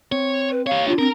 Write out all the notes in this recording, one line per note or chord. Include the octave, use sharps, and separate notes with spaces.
C4 C#5
B4
G4 C#5 F5
D4 F4
C4 A#4